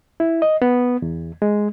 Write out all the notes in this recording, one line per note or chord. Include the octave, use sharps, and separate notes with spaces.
E4
D#5
B3
E2
G#3